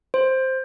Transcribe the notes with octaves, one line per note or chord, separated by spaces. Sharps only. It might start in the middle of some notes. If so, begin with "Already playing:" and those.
C5